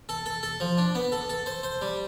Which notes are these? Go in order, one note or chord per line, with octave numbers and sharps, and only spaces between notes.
A4
A4
A4
F3
D4
B3
A4
A4
C5
C5
G3